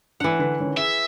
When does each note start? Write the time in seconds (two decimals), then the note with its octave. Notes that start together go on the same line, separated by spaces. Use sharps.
0.20 E3 A3 D4 F#5
0.39 D3 B4
0.60 D3 D#3 C#4
0.77 G#4 E5